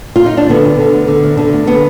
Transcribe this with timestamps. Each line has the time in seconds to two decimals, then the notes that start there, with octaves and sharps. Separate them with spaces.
0.16 F4
0.26 D#4
0.37 D4
0.49 D3 B3
0.65 D2
0.79 D3
0.93 D2
1.08 D3
1.23 D2
1.37 D3
1.53 D2
1.67 D3 B3